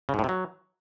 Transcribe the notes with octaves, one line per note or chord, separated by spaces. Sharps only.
C#3
G#2
A2
C3
F#3